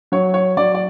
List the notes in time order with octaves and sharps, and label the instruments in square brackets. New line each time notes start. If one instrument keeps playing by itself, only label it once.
[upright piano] F#3 C#5
C#5
F#3 D5
D5